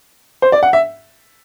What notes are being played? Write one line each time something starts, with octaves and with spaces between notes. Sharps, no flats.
C5
D5
F#5
E5